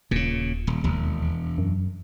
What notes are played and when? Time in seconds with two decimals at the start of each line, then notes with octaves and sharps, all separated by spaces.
0.11 D#1 A#2 C#3
0.67 D#1
0.84 E1 D#2
1.58 F#2